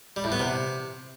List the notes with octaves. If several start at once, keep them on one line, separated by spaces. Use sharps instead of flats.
G3
A2
B3
C3